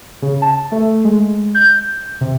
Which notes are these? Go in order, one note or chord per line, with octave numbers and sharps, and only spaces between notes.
C#3
A5
A3
G#3
G6
C3